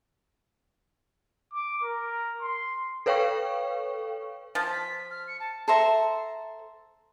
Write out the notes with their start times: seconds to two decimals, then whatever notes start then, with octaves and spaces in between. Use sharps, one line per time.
1.53 D6
1.83 A#4
2.42 C6
3.06 A4 B4 C#5 F5 G5 C#6
4.55 F3 A5
4.71 B6
5.10 F6
5.27 C#7
5.40 A5
5.68 A4 C5 E5 A#5